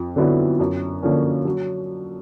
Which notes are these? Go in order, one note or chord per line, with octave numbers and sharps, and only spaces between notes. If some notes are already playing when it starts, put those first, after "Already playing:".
Already playing: F2
D3 F#3 B3 E4
F#2
D3 F3 A#3 C#4
F#3